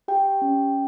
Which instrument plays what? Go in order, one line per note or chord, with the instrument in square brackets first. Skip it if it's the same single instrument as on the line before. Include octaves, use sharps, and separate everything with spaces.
[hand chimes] G4 G5
C#4